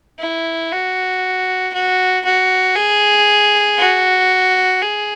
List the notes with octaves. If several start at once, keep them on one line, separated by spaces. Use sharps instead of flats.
E4
F#4
F#4
F#4
G#4
F#4
G#4